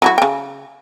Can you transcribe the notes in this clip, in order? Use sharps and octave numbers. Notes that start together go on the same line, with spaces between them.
F#3 E4 F#4
C#3 G5